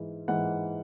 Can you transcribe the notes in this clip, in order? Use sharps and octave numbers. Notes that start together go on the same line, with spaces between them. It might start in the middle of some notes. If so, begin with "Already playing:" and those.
Already playing: G#2 E3
G#2 E3 F#5